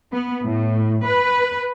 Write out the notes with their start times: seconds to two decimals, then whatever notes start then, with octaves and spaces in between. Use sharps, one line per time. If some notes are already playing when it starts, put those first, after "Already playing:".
0.13 B3
0.44 A2
1.06 B4